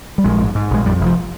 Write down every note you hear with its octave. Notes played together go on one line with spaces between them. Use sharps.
G3
A#1 G#3
G#2
G#2
A#1 G#3
F2 G3
F1
F3